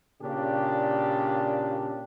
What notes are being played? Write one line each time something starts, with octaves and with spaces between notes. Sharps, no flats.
A#2 C#3 D4 G4